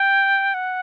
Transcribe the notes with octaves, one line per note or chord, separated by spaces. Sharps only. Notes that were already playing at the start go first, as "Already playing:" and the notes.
Already playing: G5
F#5